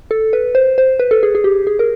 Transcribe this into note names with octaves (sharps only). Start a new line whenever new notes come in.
A4
B4
C5
C5
B4
A4
G#4
G#4
G4
G#4
A#4